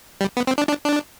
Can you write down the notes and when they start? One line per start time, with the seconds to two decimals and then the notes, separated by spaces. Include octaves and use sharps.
0.21 G3
0.37 B3
0.47 C4
0.58 D4
0.69 D4
0.85 D4